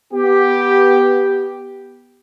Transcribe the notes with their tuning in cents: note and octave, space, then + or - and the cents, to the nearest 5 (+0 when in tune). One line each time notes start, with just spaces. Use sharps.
B3 -5 G4 +0